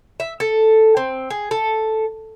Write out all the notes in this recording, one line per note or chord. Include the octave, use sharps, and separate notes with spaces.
E5
A4
C4
G#4
A4